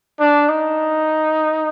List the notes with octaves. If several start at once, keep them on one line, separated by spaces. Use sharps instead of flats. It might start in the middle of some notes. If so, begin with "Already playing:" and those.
D4
D#4